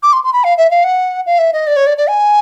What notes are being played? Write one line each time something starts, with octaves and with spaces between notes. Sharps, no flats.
D6
C6
C6
B5
F5
E5
F5
F#5
F5
E5
D#5
D5
C#5
D5
D5
G#5